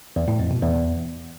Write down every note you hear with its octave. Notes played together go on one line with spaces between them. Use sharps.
E2
A2
F2
B2
E2